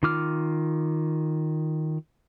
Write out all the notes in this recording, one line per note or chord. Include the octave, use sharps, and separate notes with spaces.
D#3 F4 D6 F6